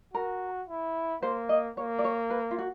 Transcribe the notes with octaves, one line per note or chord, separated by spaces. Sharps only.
F#4 A#4
E4
A#3 C5
D#5
A#3 C#5
D5
C#5
B4
F4
F#4